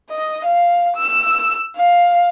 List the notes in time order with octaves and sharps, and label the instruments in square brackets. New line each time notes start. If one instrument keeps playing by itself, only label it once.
[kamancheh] D#5
F5
E6
F5